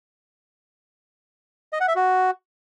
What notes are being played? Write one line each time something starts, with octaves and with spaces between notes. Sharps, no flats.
D#5
F#5
E5
F#4